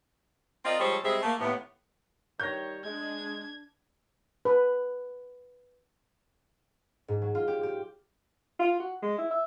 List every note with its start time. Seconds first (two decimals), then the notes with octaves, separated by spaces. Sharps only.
0.65 C4 F4 A#4 D5 D#5
0.80 F3 G3 G#3 A4 C5 C#5
1.04 C3 G3 G#3 G#4 C5 E5
1.23 A3 A#3
1.40 D#2 A2 B3
2.40 D#3 G3 C#5 G6 A#6
2.84 G#3 D4 G#6
4.45 B4
7.08 G#2
7.22 F#3
7.35 F4
7.48 G4
7.63 G4
8.59 F4
8.80 F#4
9.02 G#3
9.18 E4
9.31 E5